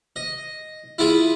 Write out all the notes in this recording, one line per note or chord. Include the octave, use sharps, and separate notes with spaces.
D#5
E4 F4 G#4